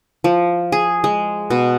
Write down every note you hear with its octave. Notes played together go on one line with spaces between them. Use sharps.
F3
G#4
G#3
B2